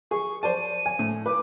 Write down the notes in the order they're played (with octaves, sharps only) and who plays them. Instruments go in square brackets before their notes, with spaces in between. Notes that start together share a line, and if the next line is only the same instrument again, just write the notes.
[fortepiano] G#4 [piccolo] C#6
[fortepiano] C5 D5 A5 [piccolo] D#7
[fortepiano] G#5
A2
[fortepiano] B4 [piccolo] D6